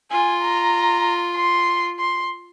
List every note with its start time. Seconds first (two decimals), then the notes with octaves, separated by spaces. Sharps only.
0.11 F4 G#5
0.42 A#5
1.36 C6
1.99 C6